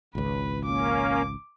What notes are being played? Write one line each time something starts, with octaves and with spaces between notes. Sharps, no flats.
G#1 C#2 B4
A#3 C#4 D6